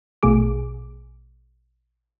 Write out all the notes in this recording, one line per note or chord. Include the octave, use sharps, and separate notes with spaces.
A#1 B2 A3 G#4 D6